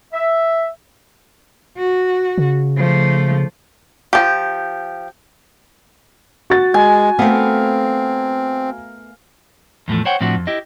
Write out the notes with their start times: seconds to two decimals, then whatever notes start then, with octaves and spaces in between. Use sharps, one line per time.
0.13 E5
1.77 F#4
2.38 C#3
2.77 F3 A3
4.13 F3 G4
6.50 F#4 A6
6.74 G#3 G#5
7.19 A3 B3 C4 A#4 F5
9.88 E2 A2 F3 A3
10.05 C5 C#5 F#5 G5
10.21 A2 F3 C4 D4 F#4
10.35 F2
10.47 E4 G4 D#5